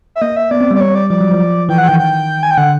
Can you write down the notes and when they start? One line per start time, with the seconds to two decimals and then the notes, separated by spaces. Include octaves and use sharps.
0.16 E5
0.21 A#3 D#5
0.36 E5
0.51 B3 D5
0.61 C4
0.71 G3 D5
0.81 C#5
0.95 D5
1.10 F3 D5
1.21 F#3
1.31 F3
1.69 E3 G5
1.78 F#5
1.88 D#3 G5
1.99 G5
2.43 G#5
2.51 G5
2.58 D3 F#5